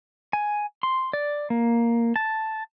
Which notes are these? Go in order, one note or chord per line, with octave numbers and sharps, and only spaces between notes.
G#5
C6
D5
A#3
A5